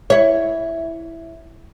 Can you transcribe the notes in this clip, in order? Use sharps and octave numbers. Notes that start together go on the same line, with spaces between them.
E4 C#5